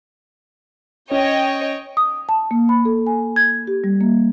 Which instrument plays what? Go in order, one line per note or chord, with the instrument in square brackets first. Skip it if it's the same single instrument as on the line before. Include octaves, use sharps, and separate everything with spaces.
[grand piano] C#4 [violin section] C#5 D#5 G5
[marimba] D#6
A5
A#3
B5
A4
G#5
G#6
G4
G3
A#3